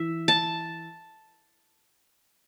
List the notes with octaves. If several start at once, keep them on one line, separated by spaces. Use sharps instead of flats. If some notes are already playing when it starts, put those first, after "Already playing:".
Already playing: E3 E5
A5